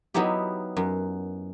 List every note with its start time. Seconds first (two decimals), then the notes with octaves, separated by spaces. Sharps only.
0.14 F#3 B3 D#4 E4 G4
0.77 F#2